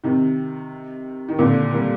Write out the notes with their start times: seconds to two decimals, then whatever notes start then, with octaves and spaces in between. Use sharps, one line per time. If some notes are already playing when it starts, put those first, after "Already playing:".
0.04 C3 D#3
1.29 D#3
1.39 A#2 D3
1.73 G3 A#3